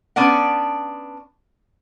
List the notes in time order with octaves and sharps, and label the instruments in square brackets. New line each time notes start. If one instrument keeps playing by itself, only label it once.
[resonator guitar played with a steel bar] B3 C#4 D4 D5 F#5